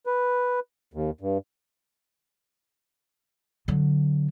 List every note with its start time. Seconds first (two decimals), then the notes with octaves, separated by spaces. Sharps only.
0.06 B4
0.94 D#2
1.21 G2
3.68 D3 F#3